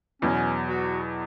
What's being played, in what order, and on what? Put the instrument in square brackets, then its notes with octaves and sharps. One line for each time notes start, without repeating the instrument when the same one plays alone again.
[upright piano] E2 B2 F#3 [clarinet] C#4
[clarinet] F#4